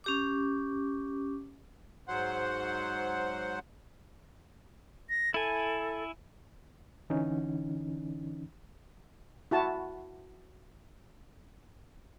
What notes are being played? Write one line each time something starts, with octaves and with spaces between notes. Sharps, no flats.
C#4 G4 D6
G#2 F#3 C5 F#5
A#6
E4 A4 G#5
D3 E3 C#4 D#4
E4 F#4 A5